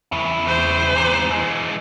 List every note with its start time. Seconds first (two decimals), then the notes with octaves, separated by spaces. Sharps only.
0.12 E2 C#3 E4
0.48 C5
0.96 G#2 C3
1.30 E3 G#3